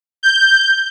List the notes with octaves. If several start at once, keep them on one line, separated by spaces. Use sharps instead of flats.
G6